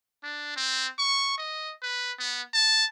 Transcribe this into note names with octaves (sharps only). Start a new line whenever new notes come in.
D4
C4
C#6
D#5
B4
B3
A5